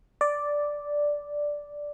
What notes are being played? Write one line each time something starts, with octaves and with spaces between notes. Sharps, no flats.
D5